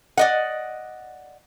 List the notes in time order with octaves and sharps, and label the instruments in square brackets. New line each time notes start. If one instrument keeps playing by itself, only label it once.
[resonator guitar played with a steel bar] D5 D#5 F#5